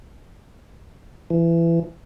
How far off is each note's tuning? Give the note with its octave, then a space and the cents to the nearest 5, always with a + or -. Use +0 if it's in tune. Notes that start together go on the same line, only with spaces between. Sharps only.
E3 +25